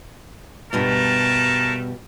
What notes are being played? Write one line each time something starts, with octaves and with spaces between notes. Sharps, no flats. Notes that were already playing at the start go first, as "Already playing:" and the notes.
G2 B2 G3 A3 A#4 A5